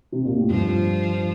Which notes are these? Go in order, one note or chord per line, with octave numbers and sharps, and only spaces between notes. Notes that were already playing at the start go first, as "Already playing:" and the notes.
C3
A#2
A2
G2 F3